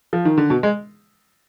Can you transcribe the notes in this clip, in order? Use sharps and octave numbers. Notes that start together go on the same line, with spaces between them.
F3
D#3
D3
B2
G#3